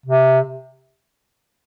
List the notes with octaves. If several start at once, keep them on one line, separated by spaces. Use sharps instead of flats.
C3